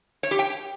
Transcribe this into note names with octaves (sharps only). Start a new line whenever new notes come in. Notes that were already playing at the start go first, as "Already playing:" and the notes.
C#5
G4
G5